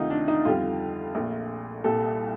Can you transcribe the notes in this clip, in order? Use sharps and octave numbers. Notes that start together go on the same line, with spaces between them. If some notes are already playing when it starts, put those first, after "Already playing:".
Already playing: D2 C3 D#3 A3 D#4 F4
D4
D#4
F2 D3 G3 F4
A#1 A#2 A3
C2 A#2 G3 A4